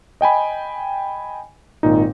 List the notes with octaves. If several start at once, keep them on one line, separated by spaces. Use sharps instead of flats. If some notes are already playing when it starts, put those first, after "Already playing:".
D#5 G5 G#5 B5
G#1 A#2 D#4